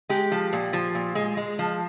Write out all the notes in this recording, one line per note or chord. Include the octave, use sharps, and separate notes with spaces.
G#3 G4
F3
A#2
F3
A#2
G#3
G#3
F3